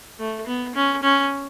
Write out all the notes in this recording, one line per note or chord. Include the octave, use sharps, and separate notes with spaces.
A3
B3
C#4
C#4